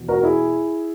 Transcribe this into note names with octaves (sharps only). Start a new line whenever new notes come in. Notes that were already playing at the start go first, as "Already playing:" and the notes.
Already playing: E2 B2
F#4 A#4
F#4
E4 G#4